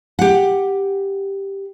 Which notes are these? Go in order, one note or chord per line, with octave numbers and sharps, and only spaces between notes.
G4 F#5